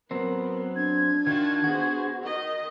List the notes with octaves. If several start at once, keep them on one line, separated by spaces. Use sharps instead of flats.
F#3 B3 C4 A#4
D4 G#6
D#3 F4 F#4 A5
B3 F#4 G#4 C5
D#3 D#5